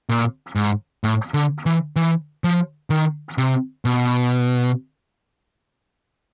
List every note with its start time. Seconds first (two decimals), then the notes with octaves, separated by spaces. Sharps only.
0.09 A#2
0.55 G#2
1.04 A2
1.34 D3
1.66 E3
1.96 E3
2.44 F3
2.90 D#3
3.38 C3
3.85 B2